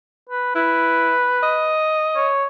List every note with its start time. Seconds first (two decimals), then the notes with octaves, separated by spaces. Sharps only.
0.29 B4
0.55 E4 B4
1.43 D#5
2.16 C#5